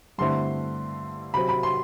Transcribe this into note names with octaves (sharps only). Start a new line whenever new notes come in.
G2 D3 A3 C4 E4 C6
C3 F#3 C4 B5
B5
C6